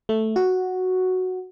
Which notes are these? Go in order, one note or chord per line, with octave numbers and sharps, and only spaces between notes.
A3
F#4